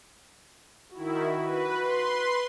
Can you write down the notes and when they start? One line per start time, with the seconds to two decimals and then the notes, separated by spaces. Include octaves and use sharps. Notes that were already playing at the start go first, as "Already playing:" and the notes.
0.94 D#3 E4 F#4
1.42 B4
1.82 B4 C6